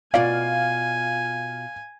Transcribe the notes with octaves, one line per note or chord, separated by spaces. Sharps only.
B2 F4 D5 F5 G#5